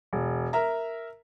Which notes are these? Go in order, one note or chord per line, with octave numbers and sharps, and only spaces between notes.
E1
A#4 E5 A#5